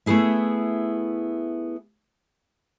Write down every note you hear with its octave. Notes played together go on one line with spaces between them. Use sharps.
A3 B3 E4 G#4 E5